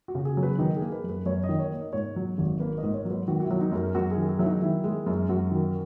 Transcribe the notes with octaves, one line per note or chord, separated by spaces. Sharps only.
F#4
C#3
G#4
F#3
B4
D#3 D#4
G#4
A#3
B4
F#2
B4
F#2 C#5
D#5
D#3
C#5
A#3
D#5
G#2 C#5
F#3
G#1
A#3 B4
D#5
G#2
C#5
F#3
B4
D#3 F#4
F#4
E4
F#3
D#4
F#2 A#4
G#4
F#2 F#4
G#4
D#3
G#4
F#3 E4
D#4
D#3 E4
G#3
F#2
F#2 F#4
D#3